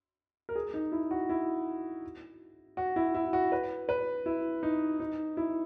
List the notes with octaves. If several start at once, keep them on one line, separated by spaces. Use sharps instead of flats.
A#4
G#4
D#4
E4
F#4
E4
F#4
E4
E4
F#4
B4
B4
E4
D#4
D#4
E4